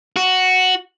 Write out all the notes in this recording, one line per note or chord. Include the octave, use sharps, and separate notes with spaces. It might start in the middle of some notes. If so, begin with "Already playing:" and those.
F#4